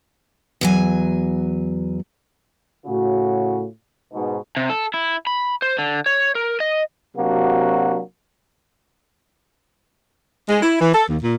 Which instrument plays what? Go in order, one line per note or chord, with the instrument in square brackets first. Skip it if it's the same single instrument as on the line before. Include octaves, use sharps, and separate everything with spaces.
[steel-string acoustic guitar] E2 F#3 G#5
[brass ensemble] A2 C#3 F#4
G#2 B2
[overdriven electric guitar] C3
A4
E4
B5
C5
D3
C#5
A#4
D#5
[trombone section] C3 F#3 A#3 D4 F#4
[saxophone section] G#3
E4
E3
A4
D#2
A#2